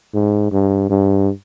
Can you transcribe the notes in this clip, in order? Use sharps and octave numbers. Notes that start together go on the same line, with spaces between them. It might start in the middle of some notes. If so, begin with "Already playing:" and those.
G#2
G2
G2